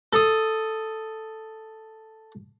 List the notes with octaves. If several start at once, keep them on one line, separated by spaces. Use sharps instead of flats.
A4 D#6